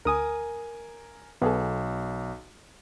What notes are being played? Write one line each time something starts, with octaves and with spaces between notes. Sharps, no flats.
D2 A#4 G#5 D#6
B1 B3 G#4 A4